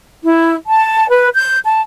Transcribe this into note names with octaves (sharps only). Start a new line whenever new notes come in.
E4
A5
B4
G6
A5